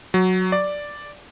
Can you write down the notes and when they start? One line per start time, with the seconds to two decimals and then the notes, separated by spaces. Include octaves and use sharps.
0.14 F#3
0.52 D5